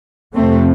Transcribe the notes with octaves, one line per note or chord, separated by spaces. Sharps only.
F2 C3 A3 C4